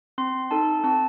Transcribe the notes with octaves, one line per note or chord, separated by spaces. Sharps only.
C4 C6
D#4 A4 A5
C4 A5